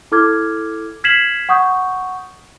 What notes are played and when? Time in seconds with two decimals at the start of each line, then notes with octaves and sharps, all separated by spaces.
0.12 E4 A4 D6 F6 G#6
1.04 F6 G#6 B6 C7 E7 F#7
1.49 F#5 C#6 D#6 G6